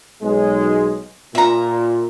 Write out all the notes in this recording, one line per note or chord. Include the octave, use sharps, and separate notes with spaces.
B1 G#3
A#2 E5 A#5